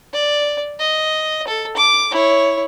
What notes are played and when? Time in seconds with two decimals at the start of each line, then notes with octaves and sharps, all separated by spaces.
0.13 D5
0.80 D#5
1.48 A4
1.77 D6
2.11 E4 C#5